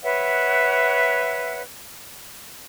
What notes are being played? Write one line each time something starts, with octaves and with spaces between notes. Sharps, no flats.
B4 C#5 E5 F#5